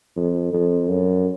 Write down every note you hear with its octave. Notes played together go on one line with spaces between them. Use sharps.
F2
F2
F#2